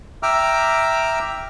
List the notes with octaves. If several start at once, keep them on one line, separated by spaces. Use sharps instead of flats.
E5 G5 A#5 D6 E6 F6